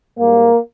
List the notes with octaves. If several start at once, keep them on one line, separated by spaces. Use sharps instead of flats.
G#2 G3 A#3